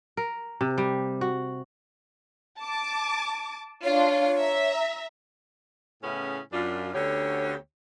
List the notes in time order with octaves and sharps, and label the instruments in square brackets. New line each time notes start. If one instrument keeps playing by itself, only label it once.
[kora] A#4
C3
G3
F#4
[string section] A5 D6
[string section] D4 F4 [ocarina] C#5
[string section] E5 A#5
[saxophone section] A2 C#3 B3 C#4 E4 G#4
F#2 D4 F4
D2 D3 B3 C#4 G4 C#5